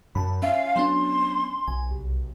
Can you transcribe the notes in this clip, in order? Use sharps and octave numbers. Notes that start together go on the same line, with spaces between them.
F#2 A5 B5
C#4 E5 F5
F#3 B3 D4 C6
B1 G#5
C2